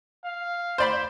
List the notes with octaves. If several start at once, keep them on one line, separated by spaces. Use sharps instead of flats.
F5
C5 D5 B5